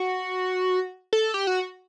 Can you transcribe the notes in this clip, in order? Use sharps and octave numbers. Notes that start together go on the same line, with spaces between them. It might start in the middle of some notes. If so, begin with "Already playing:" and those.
Already playing: F#4
A4
G4
F#4